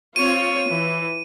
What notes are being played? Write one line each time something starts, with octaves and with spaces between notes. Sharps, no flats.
C4 F4 C#5 D#7
E3